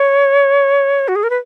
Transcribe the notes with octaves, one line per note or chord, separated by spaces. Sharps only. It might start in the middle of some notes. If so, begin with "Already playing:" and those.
Already playing: C#5
F#4
G#4
A#4
B4